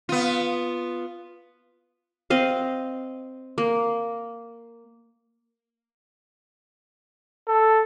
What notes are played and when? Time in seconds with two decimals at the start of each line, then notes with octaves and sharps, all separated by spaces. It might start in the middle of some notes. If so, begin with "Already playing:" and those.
0.09 B3 F4
2.30 C4 D#5 F5
3.58 A#3
7.48 A4